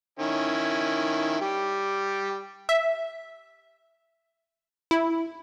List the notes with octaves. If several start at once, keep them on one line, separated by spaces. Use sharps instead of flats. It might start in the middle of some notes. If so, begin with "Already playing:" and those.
D#3 C#4 E4
G3 G4
E5
E4